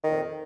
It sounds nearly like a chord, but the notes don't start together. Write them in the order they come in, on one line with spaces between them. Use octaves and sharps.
D#3 A#2 F2